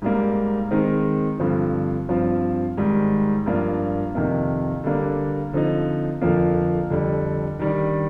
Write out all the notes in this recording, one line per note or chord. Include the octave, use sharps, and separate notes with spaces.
G#2 G3 A#3
D#3 G#3 C4 D#4
G2 D3 F3 C4
G2 F3 C4 F4
G#2 D#3 G3
G2 F3 A#3 D4 F4
F2 C3 D#3 A#3
D3 G3 A#3 D4
D3 F3 C4 D#4
F2 D3 F3 A#3
F2 D3 G3
D#3 G3 D4